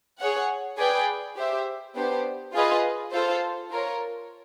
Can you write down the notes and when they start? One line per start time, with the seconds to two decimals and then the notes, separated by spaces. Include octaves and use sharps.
0.19 G#4 C#5 F#5
0.77 G#4 B4 D5 G5
1.36 G4 C5 E5
1.95 B3 D4 G4 C5
2.53 F4 G#4 B4 D#5
3.12 F4 A4 C5
3.70 F4 A#4 C#5